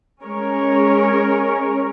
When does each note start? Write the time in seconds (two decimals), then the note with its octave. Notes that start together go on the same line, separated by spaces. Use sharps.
0.24 G#3 C#4 A#4 C#5